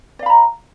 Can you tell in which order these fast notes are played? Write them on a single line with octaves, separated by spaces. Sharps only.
D5 F5 B5 A#5